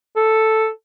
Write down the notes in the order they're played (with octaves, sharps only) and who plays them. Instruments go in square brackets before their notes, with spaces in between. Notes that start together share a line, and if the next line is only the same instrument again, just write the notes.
[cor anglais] A4